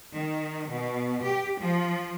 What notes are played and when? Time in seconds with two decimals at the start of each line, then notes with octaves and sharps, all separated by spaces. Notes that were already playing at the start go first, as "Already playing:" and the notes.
0.16 D#3
0.70 B2
1.23 G4
1.60 F3